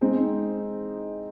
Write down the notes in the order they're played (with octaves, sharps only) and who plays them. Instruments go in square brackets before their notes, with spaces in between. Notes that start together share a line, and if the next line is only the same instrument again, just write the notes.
[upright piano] G#3 C4 D#4